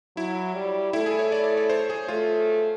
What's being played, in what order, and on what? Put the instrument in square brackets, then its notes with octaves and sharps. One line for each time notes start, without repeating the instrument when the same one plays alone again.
[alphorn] F#3 [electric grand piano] E4
[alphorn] G3
[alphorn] A3 [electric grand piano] E4
[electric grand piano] G#4
C#5
D5
D5
C#5
C5
C#5
G#4
[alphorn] A3 [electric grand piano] F4